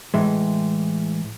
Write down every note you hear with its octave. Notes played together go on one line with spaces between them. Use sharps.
A2 E3 G#3